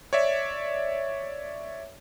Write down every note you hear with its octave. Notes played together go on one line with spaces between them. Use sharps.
C#5 D5 E5